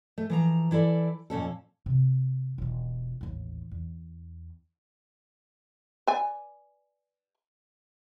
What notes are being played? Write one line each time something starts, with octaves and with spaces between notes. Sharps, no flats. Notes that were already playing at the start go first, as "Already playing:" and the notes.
A3
E3 F3 A#5
E3 E4 A4 D5
F2 A#2 C#4 A4
C3
E1 F4
A1 D#2
E2
B4 D5 G#5